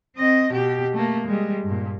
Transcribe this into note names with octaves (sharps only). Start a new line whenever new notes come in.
C4 D#5
B2 G4
A3 A#3
G3 G#3
G2 A#2